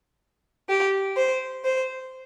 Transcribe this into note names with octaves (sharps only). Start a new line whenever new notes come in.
G4
C5
C5